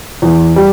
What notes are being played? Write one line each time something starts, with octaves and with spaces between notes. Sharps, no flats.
E2
G3